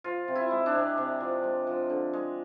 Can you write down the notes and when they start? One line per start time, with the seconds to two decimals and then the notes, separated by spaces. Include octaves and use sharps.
0.04 F3 F4
0.28 C3
0.35 E4
0.51 G#3
0.66 D4
0.74 C3
0.97 C3
1.21 F3
1.44 G#3
1.67 F3
1.90 D3
2.13 G#3